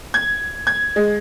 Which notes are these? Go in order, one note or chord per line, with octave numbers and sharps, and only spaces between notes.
G#6
G#6
G#3